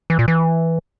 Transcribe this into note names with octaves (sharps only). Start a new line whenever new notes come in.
E3
A#2
E3